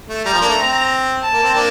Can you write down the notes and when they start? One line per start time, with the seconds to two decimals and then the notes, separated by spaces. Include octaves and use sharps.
0.09 A3
0.25 G3 A#5
0.33 F3
0.41 A#3 D4
0.49 A3
0.58 C4
1.22 A5
1.33 A#3
1.43 C4
1.54 A#3 D4